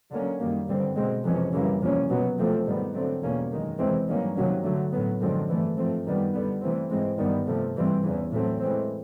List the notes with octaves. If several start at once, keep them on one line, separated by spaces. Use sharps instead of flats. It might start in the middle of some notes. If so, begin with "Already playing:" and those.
D3 F#3 A#3 C#4
F#2 D#3 G3 A#3
G2 D3 G3 C4
B2 G#3 C4
F2 C3 E3 G#3 C#4
F#2 C#3 E3 G3 A#3
E2 C3 F3 A#3 C#4
B2 F#3 B3
E2 C3 F3 A3 C4
G#2 D#3 G3 B3
D3 F#3 A3 C4
E2 B2 G3 A#3 C#4
F#2 D#3 G#3
E2 C3 E3 G#3 C4
G2 D#3 F#3 A#3 C#4
C3 D#3 F#3 A#3 C#4
D3 F#3 A3
A2 F#3 B3
F#2 D3 F3 G#3 C4
G2 E3 A3
G#2 F3 A3 C4
F#2 D#3 G3 B3
D3 G3 B3
C3 E3 A3 C4
G#2 E3 G#3 C4
G2 D#3 G3 B3
C3 F3 A3
G#2 E3 G3 C4
E2 C#3 E3
A2 F#3 A3 C4
A2 E3 G#3 C4